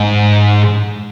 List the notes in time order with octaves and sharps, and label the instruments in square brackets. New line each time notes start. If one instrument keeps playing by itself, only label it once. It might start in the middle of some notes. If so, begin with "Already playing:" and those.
Already playing: [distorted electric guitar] G#2